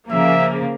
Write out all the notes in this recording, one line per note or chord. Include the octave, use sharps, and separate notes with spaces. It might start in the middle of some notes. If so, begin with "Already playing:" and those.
C#3 F3 A#3 E5